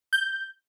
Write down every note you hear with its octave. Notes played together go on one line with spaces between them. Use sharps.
G6